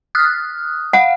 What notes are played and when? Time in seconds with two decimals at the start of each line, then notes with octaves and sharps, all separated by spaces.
0.15 D#6 F6 F#6
0.93 F5 F#5